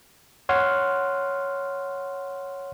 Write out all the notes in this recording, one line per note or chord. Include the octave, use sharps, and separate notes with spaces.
C#5 F#5 C6 F6